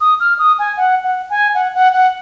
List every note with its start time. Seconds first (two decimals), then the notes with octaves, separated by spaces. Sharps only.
0.01 D#6
0.20 F6
0.39 D#6
0.59 G#5
0.77 F#5
1.04 F#5
1.30 G#5
1.55 F#5
1.75 F#5
1.93 F#5